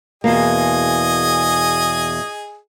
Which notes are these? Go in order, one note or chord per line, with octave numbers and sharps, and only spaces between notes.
E2 B2 A#3 G#4 D#5 G#5